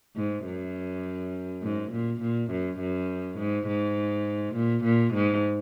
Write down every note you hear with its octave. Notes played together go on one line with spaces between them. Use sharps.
G#2
F#2
G#2
A#2
A#2
F#2
F#2
G#2
G#2
A#2
A#2
G#2